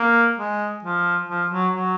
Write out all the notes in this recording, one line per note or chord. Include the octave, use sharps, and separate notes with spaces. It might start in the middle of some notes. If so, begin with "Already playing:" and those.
Already playing: A#3
G#3
F3
F3
F#3
F#3